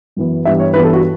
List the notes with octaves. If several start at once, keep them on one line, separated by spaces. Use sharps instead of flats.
F#2 E3 B3
G2 E3 G3 B3 E5
C#5
G2 E3 G3 B3 B4
A4
F#4